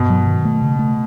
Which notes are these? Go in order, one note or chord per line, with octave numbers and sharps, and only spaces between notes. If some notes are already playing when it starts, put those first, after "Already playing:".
Already playing: G2 B2
F#3
D#3
A3
C#3
A3